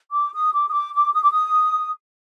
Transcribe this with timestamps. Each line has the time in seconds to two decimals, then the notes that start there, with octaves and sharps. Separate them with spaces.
0.12 D6
0.33 D#6
0.53 D6
0.67 D#6
0.73 D6
0.94 D6
1.14 D#6
1.23 D6
1.31 D#6